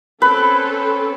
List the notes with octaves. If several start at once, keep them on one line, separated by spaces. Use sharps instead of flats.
C4 C#4 A4 B4